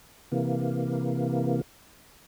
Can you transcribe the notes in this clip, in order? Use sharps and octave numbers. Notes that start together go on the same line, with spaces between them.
C3 E3 A#3